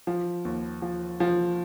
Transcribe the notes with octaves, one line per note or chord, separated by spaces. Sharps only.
F3
D#2
F3
F3